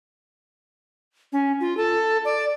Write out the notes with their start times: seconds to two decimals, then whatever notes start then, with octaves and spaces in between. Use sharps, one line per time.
1.33 C#4
1.60 F4
1.77 A4
2.25 D5